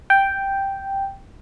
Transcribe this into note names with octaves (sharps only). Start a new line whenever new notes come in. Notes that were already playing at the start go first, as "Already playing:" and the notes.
G5